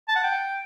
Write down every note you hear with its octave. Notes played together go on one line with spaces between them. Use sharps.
A5
F#5
G5